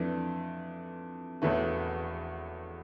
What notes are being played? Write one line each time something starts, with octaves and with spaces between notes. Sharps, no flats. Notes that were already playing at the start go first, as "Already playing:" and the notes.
Already playing: F2 E3 A3 D4
E1 E2 E3 A3